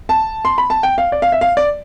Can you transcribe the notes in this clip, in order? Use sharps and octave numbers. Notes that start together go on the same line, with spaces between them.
A5
C6
B5
A5
G5
F5
D5
F5
E5
F5
D5